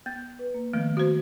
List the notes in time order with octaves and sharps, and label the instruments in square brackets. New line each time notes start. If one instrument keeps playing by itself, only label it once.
[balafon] B3 [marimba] A6
[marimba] B4
A#3
[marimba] D#3 F3 B3 [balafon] A3
[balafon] F#4 C5